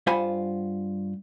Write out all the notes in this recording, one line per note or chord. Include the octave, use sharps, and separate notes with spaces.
G2 F4 C5 F#5 G#5 B5